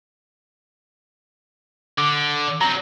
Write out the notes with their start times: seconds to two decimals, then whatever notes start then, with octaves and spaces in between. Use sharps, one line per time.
1.98 D3 D6
2.61 F#3 C4 A#5